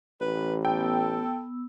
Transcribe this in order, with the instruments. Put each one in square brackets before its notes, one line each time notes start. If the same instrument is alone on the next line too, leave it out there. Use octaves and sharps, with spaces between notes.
[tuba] A1 [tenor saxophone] B4
[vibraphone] B3 E6 [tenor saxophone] A4 [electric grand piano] G5